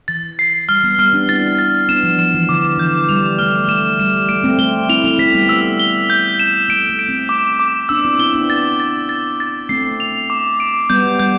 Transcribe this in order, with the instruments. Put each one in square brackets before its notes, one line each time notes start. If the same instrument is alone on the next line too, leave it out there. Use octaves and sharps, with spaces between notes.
[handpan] E3 [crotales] A6
[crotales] C7
[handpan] G3 [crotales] F6
[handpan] G3 B3
[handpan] G3 B3 [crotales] F6
[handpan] B3 D4
[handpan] C4 E4 [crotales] A6
[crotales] A6
[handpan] B3 D4 [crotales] E7
[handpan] F3
[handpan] F3 [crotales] E7
[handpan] E3
[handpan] D3 [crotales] D6
[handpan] E3 [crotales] G6
[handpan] G3 [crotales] F7
[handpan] A3 [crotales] F6
[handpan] A3 [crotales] E7
[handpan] G3 [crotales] E7
[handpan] A3 [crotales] D7
[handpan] A3 C4
[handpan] A3 C4 [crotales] G7
[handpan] C4 E4 [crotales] F7
[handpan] C4 E4
[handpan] A3 C4 [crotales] B6
[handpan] G3 B3
[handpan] A3 [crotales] E6
[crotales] G7
G6
E7
[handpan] A3 [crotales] D7
[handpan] A3
[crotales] D7
[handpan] A3 C4
[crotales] D6
D6
[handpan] B3 D4 [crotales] E6
[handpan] C4 E4
[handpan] C4 E4 [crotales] G7
[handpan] B3 D4
[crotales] A6
A6
A6
A6
[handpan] A3 C4 [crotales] C7
[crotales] F7
D6
D7
[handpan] G3 B3 [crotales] G6
[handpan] G3 [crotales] G6